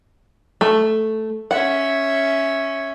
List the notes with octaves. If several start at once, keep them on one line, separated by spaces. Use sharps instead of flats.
A3
C#4 E5 F#5